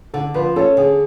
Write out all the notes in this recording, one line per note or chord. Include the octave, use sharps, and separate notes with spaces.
D3 A4
F3 B4
C#4 A4
D3 G#4